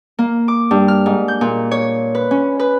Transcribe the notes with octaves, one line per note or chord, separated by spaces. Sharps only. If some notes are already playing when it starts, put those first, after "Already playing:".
A#3
D6
G2
F6
G#2
G6
A#2
C#5
B4
C#4
B4